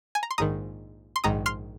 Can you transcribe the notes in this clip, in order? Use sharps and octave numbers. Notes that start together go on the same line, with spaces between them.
G#5
A#5
C6
A#1 G#2 D#3 A#5 D#6
C6
A#1 G#2 D#3 A#5 D#6
C6 F6